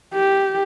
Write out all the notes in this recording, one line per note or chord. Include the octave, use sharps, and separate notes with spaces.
G4